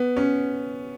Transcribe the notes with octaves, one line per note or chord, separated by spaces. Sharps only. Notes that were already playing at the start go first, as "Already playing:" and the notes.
Already playing: B3
C#4